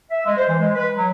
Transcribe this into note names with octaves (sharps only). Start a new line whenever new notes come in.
E5
G#3
C5
E3
G#3
B4
F#3